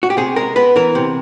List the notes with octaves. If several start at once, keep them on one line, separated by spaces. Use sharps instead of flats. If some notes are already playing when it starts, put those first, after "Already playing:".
F#4
G4
C3 G#4
G#3 A#4
B3 B4
E3 A#4
C3